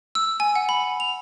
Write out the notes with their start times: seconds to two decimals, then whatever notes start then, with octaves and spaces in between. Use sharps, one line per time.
0.15 E6
0.40 G#5
0.55 F#5
0.69 B5
1.00 F7